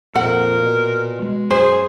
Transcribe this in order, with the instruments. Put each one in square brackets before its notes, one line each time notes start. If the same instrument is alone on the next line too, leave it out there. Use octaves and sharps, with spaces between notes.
[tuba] F2 [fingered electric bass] A#2 [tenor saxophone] A#4 [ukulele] F#5
[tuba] B2
[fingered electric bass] G#3
[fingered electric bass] F#2 [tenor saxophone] G#4 [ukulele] C5